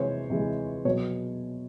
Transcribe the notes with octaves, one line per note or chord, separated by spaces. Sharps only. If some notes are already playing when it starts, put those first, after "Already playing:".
Already playing: C3 E3 G#3 C5 C#5
C3 E3 G#3
B2 F#3 C#5